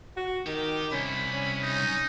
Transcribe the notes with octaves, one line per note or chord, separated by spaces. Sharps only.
F#4
D#3 G4
C2 C#4 B5
C#4
D#4